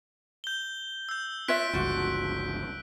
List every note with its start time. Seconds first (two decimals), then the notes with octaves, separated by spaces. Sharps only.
0.44 G6 G7
1.09 E6 G6
1.48 F4 C#5 E5 F#6 B6 D7
1.73 G1 C#2 G2 F4 F#4